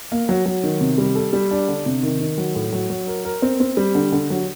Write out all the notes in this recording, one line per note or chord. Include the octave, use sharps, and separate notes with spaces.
A#3
F#3
F#3
D#3
C3
G3
A4
G3
D4
D3
C3
D#3
D#3
F#3
A2
F#3
F#3
A#4
A#4
C4
C4
G3
D3
D3
F#3